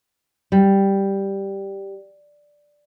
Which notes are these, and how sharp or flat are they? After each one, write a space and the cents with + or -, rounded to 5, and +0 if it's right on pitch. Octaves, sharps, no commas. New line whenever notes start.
G3 +0